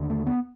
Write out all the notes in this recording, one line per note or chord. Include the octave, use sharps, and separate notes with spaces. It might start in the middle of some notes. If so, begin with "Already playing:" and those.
Already playing: D#2 D3
A3
B3